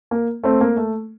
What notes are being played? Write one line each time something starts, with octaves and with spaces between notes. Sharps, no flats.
A#3
A3 C4
A#3
A3